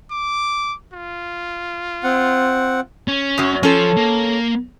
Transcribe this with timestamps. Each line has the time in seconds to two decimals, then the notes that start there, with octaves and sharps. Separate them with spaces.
0.11 D6
0.93 F4
2.04 C4 F#5
3.08 C#4
3.38 F#2 F#3
3.63 F3 C#4 A4
3.97 A#3